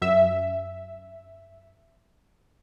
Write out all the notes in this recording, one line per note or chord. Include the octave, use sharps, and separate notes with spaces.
F#2 E5